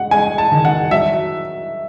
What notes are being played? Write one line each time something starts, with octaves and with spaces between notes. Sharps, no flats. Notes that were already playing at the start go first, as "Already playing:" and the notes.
Already playing: G#3 F#5
G#3 G#5
A5
D#3
F#5
F#3 E5